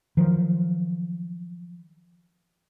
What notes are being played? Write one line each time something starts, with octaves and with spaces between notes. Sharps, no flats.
D#3 F3 F#3